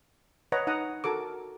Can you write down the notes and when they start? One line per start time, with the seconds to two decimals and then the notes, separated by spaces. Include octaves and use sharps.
0.52 B4 C#5 D#5 F#5 A#5
0.67 D#4 F#5 A#5 D#6
1.04 F#4 A4 A#4 D6